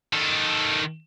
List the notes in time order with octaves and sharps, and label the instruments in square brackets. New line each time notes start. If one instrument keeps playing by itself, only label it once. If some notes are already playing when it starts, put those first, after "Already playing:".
[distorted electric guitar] D#3 A4